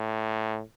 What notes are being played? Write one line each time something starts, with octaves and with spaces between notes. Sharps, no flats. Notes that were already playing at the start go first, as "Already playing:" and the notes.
Already playing: A2